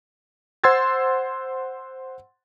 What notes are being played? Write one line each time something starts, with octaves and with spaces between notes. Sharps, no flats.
C5 F#5 C6 E6 G#6 A6